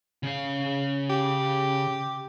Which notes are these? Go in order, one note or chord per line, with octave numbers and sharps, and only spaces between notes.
C#3 F5
G4